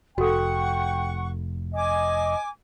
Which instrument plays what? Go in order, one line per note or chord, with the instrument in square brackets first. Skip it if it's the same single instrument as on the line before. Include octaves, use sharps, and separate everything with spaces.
[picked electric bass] F1 [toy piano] F#4 A4 [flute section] F#5 C#6 [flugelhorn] G5
[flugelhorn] D#5 [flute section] G#5 D6